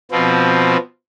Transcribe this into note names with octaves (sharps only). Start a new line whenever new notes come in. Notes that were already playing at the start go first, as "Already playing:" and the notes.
B2 F3 B3 C4